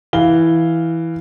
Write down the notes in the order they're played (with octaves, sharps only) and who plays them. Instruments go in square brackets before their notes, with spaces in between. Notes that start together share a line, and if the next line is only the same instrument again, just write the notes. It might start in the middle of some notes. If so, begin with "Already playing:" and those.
[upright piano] E3 F5 G7